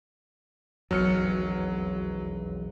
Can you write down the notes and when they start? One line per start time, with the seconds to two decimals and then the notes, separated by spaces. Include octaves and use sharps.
0.91 E1 B1 F2 F#3 F6 C#7